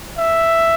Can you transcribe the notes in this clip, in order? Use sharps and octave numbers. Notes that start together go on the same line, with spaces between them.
E5